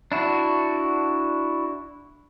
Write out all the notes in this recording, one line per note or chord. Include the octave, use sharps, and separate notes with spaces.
D4 E4 F#4